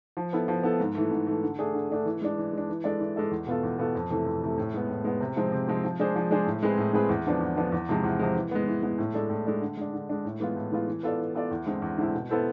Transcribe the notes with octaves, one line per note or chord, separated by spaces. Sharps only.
F3
B3 E4 A4
F3
B3 E4 A4
G#2
E3 A3
G#2
E3 A3
D3
A3 D4 G#4
D3
A3 D4 G#4
E3
G#3 D4
E3
G#3 D4
E3
G#3 D4 A4 D5
E3
G#3 D4 A4 D5
E2
B2 B3 F4 A4
E2
B2 B3 F4 A4
F2
C3 E3 A3
F2
C3 E3 A3
A2
G#3 B3
A2
G#3 B3
C3
F3 G#3 C4
C3
F3 G#3 C4
F3
G#3 D4 G#4 C5
F3
G#3 D4 G#4 C5
A2
G#3 C4 G#4 B4
A2
G#3 C4 G#4 B4
E2
D3 F3 B3 D4
E2
D3 F3 B3 D4
E2
C3 F3 G#3
E2
C3 F3 G#3
E3
G#3 B3
E3
G#3 B3
A2
G#3 D4 A4
A2
G#3 D4 A4
D3
G#3 D4
D3
G#3 D4
A2
E3 G#3 B3 F4
A2
E3 G#3 B3 F4
E3
B3 F4 A4 D5
E3
B3 F4 A4 D5
E2
D3 G#3 C4 E4
E2
D3 G#3 C4 E4
B2
B3 E4 A4 C5